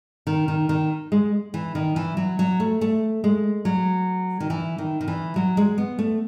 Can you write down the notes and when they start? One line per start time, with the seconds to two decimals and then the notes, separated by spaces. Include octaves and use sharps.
0.27 D#3
0.48 D#3
0.69 D#3
1.12 G#3
1.54 E3
1.75 D#3
1.96 E3
2.17 F#3
2.39 F#3
2.60 A3
2.81 A3
3.24 G#3
3.65 F#3
4.40 D#3
4.50 E3
4.78 D#3
5.01 D#3
5.08 E3
5.36 F#3
5.57 G#3
5.78 B3
5.99 A3